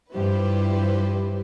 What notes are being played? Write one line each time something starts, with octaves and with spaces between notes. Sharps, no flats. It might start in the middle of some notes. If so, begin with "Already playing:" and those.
G2 F3 E4 G4 B4 C5